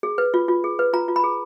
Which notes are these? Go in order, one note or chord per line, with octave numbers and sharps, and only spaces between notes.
G#4
B4
F4
F4
G#4
B4
F4 A#5
F4
B5
G#4